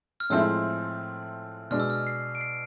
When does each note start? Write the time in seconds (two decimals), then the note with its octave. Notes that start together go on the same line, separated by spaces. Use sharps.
0.20 F6
0.30 A2 F3 G#3 C4 E4 E6
1.71 B2 G#3 D4 F6
1.80 E6
1.90 F6
2.07 C7
2.35 D7
2.41 C7